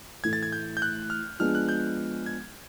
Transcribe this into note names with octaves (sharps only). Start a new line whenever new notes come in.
A2 E3 A3 G#6
A6
G#6
G6
G6
F#6
F6
F3 G#3 B3 D4 F6
F#6
G6
G#6